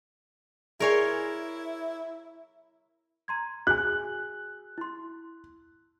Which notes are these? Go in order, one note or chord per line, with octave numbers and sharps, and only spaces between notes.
E4 G#4 A#4 C#5 D5 G#5 C6
A#5 C6 G#6
F#4 G#4 G#5 F#6
E4 C6